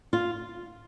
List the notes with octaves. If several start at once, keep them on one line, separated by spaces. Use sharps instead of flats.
F4